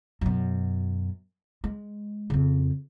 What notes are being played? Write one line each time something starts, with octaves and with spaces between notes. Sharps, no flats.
F#2 B2
G#3
F2 C#3